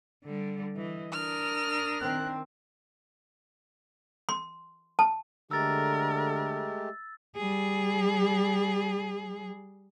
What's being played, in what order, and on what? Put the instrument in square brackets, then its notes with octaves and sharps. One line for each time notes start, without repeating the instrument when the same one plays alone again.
[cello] D3 G3
[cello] E3 [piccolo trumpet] D#5
[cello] D4 A#4 [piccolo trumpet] D#6 [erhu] F6
[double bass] D#3 C4 [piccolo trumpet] F#6
[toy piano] C6
A5
[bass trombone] D3 [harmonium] G#3 A3 G4 [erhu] A#4 [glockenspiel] E6 A6
[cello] G3 G#4